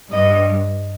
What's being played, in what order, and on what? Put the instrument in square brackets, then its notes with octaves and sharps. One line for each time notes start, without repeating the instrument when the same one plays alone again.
[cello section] G2 [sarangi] D#5